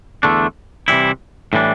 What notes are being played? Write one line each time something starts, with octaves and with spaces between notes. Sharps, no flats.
E2 D3 A3 D4
C3 E3 G3 E4
A2 E3 G3 D4